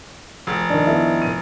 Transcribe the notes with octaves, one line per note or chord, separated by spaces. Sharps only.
F1
D#3 D4
B3 E4 E5
D#7